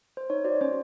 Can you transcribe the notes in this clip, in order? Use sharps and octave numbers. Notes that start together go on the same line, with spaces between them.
C5
D#4 C#5
F#4 C5 D5
C#4 C5